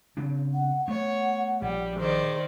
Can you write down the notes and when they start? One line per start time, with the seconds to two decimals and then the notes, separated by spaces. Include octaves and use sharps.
0.17 C#3 C4 D4
0.54 F#5
0.88 A3 B3 C#5 F#5
1.62 A#1 G3
1.99 D#3 G#4 C5 D5